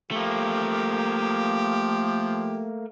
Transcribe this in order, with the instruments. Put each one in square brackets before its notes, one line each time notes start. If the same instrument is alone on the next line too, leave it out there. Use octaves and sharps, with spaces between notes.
[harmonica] F3 G4 [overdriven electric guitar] A3 A#3